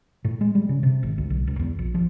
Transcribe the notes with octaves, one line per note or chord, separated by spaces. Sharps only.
A2
G#3
G3
C#3
C3
G#1
D2
B1
C#2
E2
A#1
F3